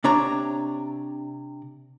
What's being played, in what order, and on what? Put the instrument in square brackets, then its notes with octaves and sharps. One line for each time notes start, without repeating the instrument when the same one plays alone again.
[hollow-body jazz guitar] C3 D4 C#5 A#5